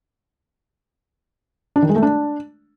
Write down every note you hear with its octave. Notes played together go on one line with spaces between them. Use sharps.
D4
D#3
G#3
A3
D4